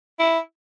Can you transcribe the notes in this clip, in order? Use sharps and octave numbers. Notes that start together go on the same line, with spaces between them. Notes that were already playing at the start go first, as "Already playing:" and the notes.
E4